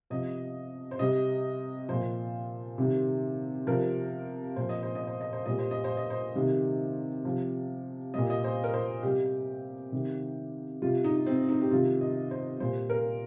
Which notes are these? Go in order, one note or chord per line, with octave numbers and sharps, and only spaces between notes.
C3 F3 D#5
C5
C3 G3 D#5
A#2 F3 C5
C3 D#3 G3
C3 F3 A#4
A#2 F3 C5
D#5
C5
D#5
C5
D#5
C5
A#2 G3 D#5
C5
D#5
C5
D#5
C5
C3 D#3 G3
C3 F3
A#2 G3 D#5
D#5
C5
A#4
C5
C3 G3 G4
C3 D#3 G3
C3 G3 F4
D#4
C4
D#4
G4
C3 D#3 G3 F4
D#5
C5
A#2 G3 C5
A#4